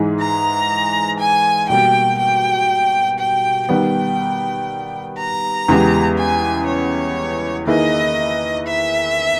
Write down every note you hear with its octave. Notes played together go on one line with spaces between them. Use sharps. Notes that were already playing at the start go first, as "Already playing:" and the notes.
Already playing: G#2 E3 G#3 D#4 G#4
A#5
G#5
B2 G3 A#3 G5
G5
G5
D#3 G3 B3 G5
A#5
E2 C#3 G#3 B3 G4
G#5
C#5
D#3 A#3 E4 G#4 B4 D#5
E5